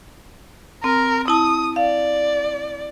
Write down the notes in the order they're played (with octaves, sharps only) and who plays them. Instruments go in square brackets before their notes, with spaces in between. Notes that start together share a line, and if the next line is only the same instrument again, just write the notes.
[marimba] C4 [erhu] A#4
[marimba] E4 A5 [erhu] D#6
[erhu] D5 [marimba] F5